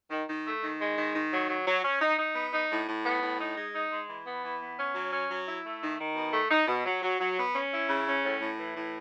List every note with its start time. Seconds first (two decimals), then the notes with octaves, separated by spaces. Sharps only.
0.11 D#3
0.28 D#3
0.45 A3
0.62 D#3
0.79 G#3
0.97 D#3
1.14 D#3
1.32 F#3
1.49 F#3
1.66 F#3
1.84 C#4
2.01 D#4
2.18 D#4
2.35 B3
2.53 D#4
2.70 A2
2.88 A2
3.04 B3
3.22 A2
3.39 D#4
3.56 G#3
3.74 D#4
3.91 G#3
4.09 E3
4.26 B3
4.43 E3
4.60 B3
4.78 C#4
4.95 F#3
5.12 C#4
5.29 F#3
5.47 E4
5.64 A3
5.82 D#3
5.99 D#3
6.15 B2
6.33 A3
6.50 D#4
6.67 B2
6.85 F#3
7.02 F#3
7.20 F#3
7.37 B3
7.54 C#4
7.72 E4
7.88 C#3
8.07 C#4
8.23 A2
8.41 A2
8.58 E3
8.75 A2